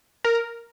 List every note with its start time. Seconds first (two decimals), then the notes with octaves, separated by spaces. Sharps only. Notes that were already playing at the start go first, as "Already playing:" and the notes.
0.24 A#4